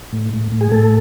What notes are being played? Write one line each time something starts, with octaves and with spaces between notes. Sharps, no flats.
A2
A2
A2
G#4
A2 A4